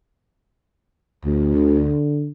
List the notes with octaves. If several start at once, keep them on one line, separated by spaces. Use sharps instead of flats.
D2
D3